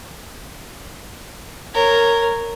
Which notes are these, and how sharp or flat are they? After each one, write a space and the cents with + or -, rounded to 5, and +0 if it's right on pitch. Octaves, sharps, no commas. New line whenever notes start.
A#4 -10 C#5 +0